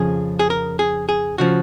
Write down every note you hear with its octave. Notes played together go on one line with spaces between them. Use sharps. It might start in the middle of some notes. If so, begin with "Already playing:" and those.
Already playing: F2 C#3 F3 G#4
G#4
A#4
G#4
G#4
C#3 F3 F#4